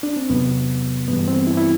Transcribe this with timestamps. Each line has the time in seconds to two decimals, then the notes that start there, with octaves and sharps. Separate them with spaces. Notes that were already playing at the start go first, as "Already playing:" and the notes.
0.03 D4
0.17 C4
0.30 E2 C3 F#3 B3
1.08 G2 E3 G3 B3
1.28 C4
1.47 E4
1.57 E4